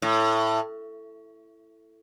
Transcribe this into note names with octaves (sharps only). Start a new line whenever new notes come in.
A2